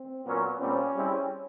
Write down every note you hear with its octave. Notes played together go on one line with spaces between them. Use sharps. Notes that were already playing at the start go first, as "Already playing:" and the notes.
Already playing: C4
A#2 F#3 A#3 B3 C#4
A#2 G3 C4 C#4
G3 C4 E4 G#4